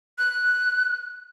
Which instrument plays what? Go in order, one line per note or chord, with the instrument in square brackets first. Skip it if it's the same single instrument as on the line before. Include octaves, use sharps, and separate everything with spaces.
[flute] F#6